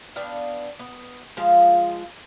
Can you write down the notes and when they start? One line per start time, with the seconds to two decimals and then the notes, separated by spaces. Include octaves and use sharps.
0.16 B3 D4 F5 G5
0.79 B3
1.37 F3 G#3 F4 F5